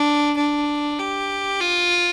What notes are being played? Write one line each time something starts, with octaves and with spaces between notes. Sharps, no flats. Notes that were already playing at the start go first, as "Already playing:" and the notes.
Already playing: D4
D4
G4
F4